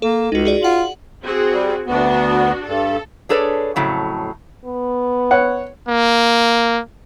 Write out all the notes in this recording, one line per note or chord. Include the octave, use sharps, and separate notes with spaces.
A#3 A4
C#2 D#4 F#4
F#4 G#4 D5
F4 F#5 F#7
C4 F#4 G#4
G3
D2 B3 D4 F#4
G2 A4
D4 G#4 A4 B4 C#5 D5
F2 A2 C#3 F#3
B3
C#5 F#5
A#3